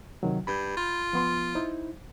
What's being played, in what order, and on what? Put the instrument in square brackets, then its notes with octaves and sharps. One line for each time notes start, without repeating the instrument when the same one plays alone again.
[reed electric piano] C3 D#3 F#3
[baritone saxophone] G2 [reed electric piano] B5 G6
[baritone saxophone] F4
[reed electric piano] F3 B3 C6
D#4 E4 C5